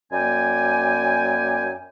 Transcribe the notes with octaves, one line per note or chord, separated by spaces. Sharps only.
F#2 A#3 D5 G5 G#5